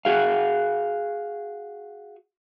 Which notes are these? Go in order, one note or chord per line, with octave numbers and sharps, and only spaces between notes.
F#4 G#4 F5